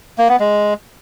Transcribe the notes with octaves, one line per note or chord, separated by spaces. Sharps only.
A#3
B3
G#3